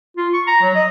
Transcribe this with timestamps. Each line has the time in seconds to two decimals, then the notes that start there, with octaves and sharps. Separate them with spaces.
0.17 F4
0.34 C#6
0.47 A#5
0.62 F#3
0.75 D#5